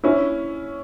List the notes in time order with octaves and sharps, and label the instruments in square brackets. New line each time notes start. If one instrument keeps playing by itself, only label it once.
[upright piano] C#4 E4